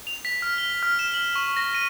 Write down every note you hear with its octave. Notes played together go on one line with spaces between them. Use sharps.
F7
B6
F6
G7
F6
E7
F#7
C#6
A#6
D#7